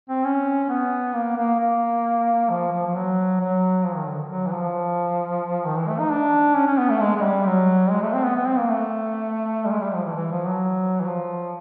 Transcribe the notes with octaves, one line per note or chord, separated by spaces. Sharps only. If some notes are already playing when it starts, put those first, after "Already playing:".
C4
C#4
B3
A#3
A#3
A#3
F3
F3
F3
F#3
F#3
F3
D#3
D3
F#3
E3
F3
D#3
E3
A3
D#4
D4
C#4
C#4
B3
A3
G#3
G#3
G3
F#3
G#3
A3
C4
B3
B3
C4
A#3
A3
G3
G#3
G3
F3
E3
E3
F3
F#3
E3
F3